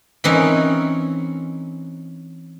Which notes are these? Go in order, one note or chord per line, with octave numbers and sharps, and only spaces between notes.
E3 C4 C#4 D#4 A#4